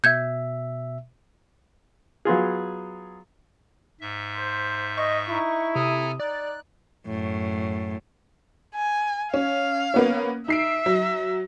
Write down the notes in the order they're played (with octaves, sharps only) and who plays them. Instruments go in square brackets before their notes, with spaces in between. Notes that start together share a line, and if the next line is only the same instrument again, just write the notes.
[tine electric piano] B2 E5 [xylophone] G6 G#6
[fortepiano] F#3 B3 F4 G#4
[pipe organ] G#2 E5
[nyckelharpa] C5
[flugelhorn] D#5 [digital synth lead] C#6
[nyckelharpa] D#4 [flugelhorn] E4
[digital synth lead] C3 [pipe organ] A4 G#5 A#5 [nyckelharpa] D#6
[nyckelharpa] D#4 [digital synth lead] D5 [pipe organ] F#6
[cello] F#2 A2
[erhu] G#5
[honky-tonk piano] C#4 [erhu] F5
[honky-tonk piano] A#3 B3 C#4
[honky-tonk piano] D#4 C7 D7 [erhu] E5
[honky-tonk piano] F#3